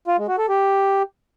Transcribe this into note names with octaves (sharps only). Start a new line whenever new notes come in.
F4
G#3
F#4
A4
G4